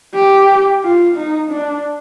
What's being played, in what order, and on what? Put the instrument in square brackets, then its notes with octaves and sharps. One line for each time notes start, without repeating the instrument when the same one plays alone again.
[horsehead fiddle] G4
F4
D#4
D4